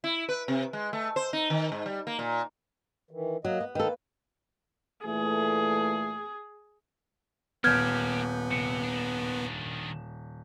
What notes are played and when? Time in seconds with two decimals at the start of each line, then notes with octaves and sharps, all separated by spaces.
0.04 E4
0.29 B4
0.48 C3
0.73 G#3
0.93 A3
1.16 C5
1.33 D#4
1.50 D#3
1.72 G#2
1.86 G3
2.07 A#3
2.19 A#2
3.11 D#3 E3
3.45 F#3 A#3 D#5
3.60 B3
3.75 D#3 A#3 A4 B4
5.06 A#2 E3 A3 G#4
7.64 D#1 A#3 B3 G4 F6 G6 G#6
8.51 C3 C#7
8.83 D#3 D4